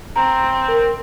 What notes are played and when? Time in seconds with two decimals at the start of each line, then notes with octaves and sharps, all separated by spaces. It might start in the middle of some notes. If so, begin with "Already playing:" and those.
0.16 C4 A#5
0.68 A#4